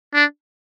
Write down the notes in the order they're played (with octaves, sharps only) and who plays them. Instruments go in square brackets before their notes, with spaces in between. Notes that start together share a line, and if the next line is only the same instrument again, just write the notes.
[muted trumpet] D4